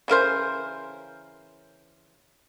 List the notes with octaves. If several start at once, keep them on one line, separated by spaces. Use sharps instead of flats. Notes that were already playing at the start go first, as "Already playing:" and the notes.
C#3 E3 A#4 C5